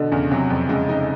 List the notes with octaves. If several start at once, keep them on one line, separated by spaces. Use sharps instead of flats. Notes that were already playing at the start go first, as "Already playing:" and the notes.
Already playing: B2 D3
E2 C#3
C3 F#3
F2
C#3 G#3
C#3 D#4